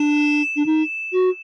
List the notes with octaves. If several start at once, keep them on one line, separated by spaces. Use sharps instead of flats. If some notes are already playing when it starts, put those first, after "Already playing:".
Already playing: D4 E7
D4
D#4
F#4